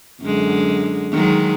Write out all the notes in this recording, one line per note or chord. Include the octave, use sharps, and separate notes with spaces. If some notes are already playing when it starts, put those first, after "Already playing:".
F#2 D3 G#3
D#3 F#3 G#3